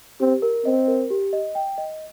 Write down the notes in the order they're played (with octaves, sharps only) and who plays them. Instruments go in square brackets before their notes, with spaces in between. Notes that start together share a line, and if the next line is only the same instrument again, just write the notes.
[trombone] C4 [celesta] G4
[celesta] A#4
[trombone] C4 [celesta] D#5
[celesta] A#4
G4
D#5
G5
D#5